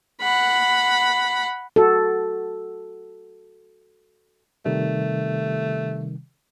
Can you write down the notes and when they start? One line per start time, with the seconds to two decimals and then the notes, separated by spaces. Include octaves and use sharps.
0.21 F#5 B5
1.76 F#4 A4
4.65 C3 D#3 G3 A3